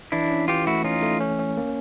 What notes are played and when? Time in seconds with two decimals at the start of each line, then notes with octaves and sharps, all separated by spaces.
0.12 E3 D4 E4
0.30 C#4
0.48 E3 F4 G4
0.67 A3 E4 F#4
0.84 C#4 D#4 F4
1.03 A3
1.20 C#4
1.39 C#4
1.57 A#3